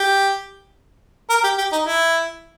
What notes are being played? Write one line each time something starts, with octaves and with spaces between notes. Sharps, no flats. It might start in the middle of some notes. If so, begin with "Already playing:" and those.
Already playing: G4
A#4
G4
G4
D#4
E4